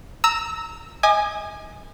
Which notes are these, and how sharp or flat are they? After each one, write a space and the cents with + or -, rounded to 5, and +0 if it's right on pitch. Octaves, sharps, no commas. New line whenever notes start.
A#5 -10 E6 -20
D#5 +35 G#5 +0 D#6 -45